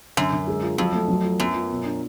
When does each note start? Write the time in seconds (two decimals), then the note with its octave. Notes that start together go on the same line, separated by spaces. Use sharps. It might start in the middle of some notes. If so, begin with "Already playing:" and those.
0.17 F#2 D3
0.32 D3
0.47 G#3
0.62 F4
0.78 F2 F#3
0.94 A3
1.08 F#3
1.24 F4
1.39 F#2 B3
1.55 F4
1.70 B2
1.85 D4